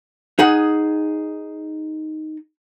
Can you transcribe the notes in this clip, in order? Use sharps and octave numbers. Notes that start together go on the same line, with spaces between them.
D#4 G#4 F#5